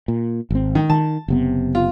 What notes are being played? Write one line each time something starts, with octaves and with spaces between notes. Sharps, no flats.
A#2
G#1 C4
D#3
D#3 A5
F#1 C3 B3
F4